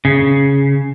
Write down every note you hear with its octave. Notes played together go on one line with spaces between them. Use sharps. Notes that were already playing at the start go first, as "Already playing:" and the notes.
C#3